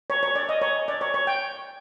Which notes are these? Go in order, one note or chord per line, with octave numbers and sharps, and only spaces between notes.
C#5
C#5
D5
D#5
C#5
D5
C#5
C#5
G5